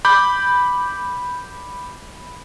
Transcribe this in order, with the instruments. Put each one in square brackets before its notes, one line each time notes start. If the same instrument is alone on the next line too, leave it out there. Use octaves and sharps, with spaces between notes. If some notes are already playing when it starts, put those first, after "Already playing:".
[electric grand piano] B5 D6 G6